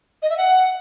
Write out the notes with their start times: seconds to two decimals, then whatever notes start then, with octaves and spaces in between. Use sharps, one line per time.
0.22 D#5
0.30 E5
0.37 F#5